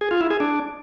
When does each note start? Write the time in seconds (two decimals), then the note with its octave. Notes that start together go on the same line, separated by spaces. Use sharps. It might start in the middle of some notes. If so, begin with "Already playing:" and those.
0.01 G#4
0.11 F4
0.21 E4
0.30 G#4
0.40 D4